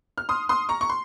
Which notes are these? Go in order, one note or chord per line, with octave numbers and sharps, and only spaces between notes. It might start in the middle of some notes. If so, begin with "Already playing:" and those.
F6
C6 D#6
C6 D#6
A#5 C#6
C#6
C6